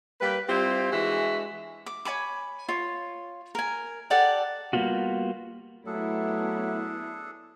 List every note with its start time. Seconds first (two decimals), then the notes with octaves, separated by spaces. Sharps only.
0.20 G3 A#3 G4 B4
0.48 G3 C4 E4 F4 G4
0.92 E3 G#3 D4 F#4 G#4 E5
1.86 D6
2.05 C#5 G#5 B5 D6
2.68 F4 C#5
3.55 A#4 G#5
4.10 G4 A4 D5 F#5
4.73 G3 A#3 B3 F4 F#4
5.86 F#3 A3 B3 D4 E4 G#4 A4